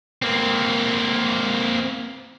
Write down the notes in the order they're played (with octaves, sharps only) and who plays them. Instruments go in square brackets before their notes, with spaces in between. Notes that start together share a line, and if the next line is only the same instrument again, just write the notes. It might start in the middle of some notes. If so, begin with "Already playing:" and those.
[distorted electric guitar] A#3 C4